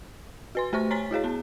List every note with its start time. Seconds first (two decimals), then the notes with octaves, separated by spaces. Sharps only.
0.55 F#4 B4 C6
0.73 A3 G4 C5 C#6
0.91 C#5 G#5 C6 A6 B6
1.11 E4 F#4 G#4 C#5
1.24 B3 A5